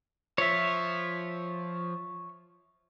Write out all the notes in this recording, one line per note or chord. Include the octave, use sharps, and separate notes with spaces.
F3 C#5 E5